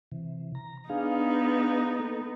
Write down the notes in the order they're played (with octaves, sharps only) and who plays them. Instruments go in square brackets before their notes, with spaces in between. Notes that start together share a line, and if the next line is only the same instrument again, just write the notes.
[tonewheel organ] C3 E3
A#5
[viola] B3 D#4 [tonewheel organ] D4 G#4 F5
[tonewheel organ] A#3 A4